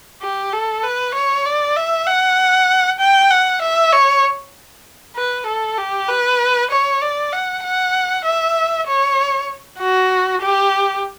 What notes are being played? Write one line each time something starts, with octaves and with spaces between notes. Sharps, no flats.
G4
A4
B4
C#5
D5
E5
F#5
G5
F#5
E5
C#5
B4
A4
G4
B4
C#5
D5
F#5
F#5
E5
C#5
F#4
G4